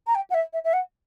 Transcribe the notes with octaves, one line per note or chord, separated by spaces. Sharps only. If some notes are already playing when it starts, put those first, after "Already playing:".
A#5
G5
F#5
E5
E5
E5
F#5